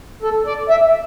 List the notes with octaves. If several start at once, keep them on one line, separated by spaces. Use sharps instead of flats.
A4
D5
E5